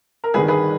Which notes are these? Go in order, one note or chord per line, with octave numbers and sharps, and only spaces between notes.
A#4
G1 G2 D#3 G#4 B4
G#4 B4